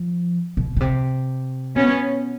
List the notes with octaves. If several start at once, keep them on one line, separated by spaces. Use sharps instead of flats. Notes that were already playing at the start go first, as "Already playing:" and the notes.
Already playing: F3
B2
B2
C3
B2 B3 C#4